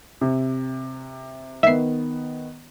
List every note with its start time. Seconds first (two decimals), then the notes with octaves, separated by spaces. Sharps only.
0.21 C3
1.63 D#3 B3 E5 C7